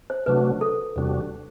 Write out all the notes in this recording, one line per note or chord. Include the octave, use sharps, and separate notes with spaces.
C5
C3 F#3 A3 D4 F#4 B4
A4
E2 C3 G3 D4 F#4